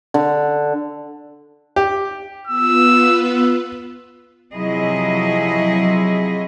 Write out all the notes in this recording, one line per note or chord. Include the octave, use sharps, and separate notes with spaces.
D3
G4
B3 F4 B4 E6
C3 F3 F#3 E4 G#4 D#5